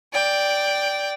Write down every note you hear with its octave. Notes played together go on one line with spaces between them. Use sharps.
D5 G5